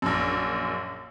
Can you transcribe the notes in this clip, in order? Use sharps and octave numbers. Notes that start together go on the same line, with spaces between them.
A#1 F#2